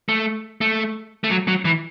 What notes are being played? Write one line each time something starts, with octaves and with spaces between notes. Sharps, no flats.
A3
A3
A3
F#3
F#3
E3